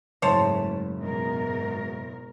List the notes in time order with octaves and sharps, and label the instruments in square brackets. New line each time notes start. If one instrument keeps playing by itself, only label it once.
[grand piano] F#1 [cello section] G#2 A3 [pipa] C5 C#5 A5
[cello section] G#2 B2 A#4